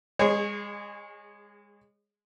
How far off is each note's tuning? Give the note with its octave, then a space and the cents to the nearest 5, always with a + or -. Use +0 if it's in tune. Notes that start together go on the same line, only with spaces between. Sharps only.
G#3 -30 G#4 +0 C#5 -25